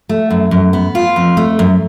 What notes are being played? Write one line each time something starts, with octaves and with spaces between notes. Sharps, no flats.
A3
F#2
F#2
B3
F4
F2
A3
F#2